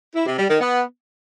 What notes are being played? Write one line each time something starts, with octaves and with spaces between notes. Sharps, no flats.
E4
C3
G3
D#3
B3